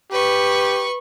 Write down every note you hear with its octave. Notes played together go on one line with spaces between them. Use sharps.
G4 B4 C#6